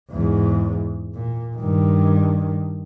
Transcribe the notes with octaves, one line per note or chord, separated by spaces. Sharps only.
E2 G#2
A#2
G2 D#3